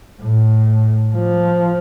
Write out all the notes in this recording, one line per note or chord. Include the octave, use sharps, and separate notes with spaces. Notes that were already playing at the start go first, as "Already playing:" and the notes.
A2
F3